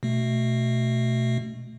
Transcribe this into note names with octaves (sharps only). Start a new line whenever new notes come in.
B2 A3